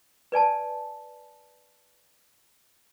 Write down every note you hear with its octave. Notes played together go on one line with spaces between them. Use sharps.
B4 D5 G#5 A5